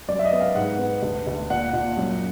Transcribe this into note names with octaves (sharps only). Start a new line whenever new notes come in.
F#2 D5
E5
D#5
B3
F5
G#2 F#5
B3
D2
D2
A#2 F#5
A#2
F#2